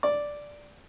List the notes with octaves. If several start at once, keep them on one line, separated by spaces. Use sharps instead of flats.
D5